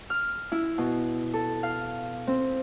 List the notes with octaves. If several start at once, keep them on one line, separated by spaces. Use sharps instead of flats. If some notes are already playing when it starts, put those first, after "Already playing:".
F6
E4
B2
A4
F5
C4